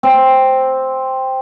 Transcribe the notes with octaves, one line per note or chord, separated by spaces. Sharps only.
C4